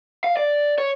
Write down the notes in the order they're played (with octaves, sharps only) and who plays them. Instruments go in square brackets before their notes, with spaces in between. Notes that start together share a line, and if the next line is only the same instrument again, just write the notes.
[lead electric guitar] F5
D5
C#5